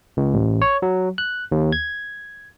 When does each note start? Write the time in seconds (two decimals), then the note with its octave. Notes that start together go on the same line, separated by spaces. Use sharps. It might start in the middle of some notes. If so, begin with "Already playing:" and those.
0.17 C#2
0.34 A1
0.62 C#5
0.82 F#3
1.18 F#6
1.52 D#2
1.72 G#6